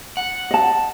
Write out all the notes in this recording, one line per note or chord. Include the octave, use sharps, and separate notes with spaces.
F#5
D#5 A5